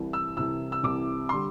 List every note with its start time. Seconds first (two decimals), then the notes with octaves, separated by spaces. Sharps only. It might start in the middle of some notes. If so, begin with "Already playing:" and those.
Already playing: C2 C3 E3
0.13 E6
0.37 C2 C3 E3 E6
0.72 E6
0.83 C2 C3 E3 D6
1.29 D3 G3 C6